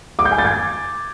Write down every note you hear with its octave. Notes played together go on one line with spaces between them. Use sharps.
D6
G6
G#5
A6
G#6